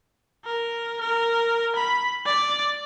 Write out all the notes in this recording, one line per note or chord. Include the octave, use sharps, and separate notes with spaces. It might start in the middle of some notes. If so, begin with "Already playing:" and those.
A#4
A#4
B5
D5